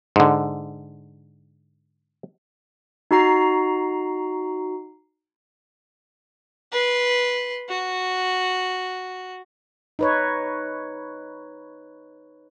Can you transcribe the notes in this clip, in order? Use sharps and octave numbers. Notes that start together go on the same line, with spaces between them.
G#2 D3
D#4 F#4 A#5 C7
B4 C6
F#4
D#4 B4 C#5